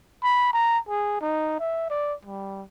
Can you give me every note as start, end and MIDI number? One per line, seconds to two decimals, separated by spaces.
0.23 0.52 83
0.53 0.79 82
0.88 1.18 68
1.21 1.56 63
1.59 1.87 76
1.90 2.14 74
2.25 2.64 55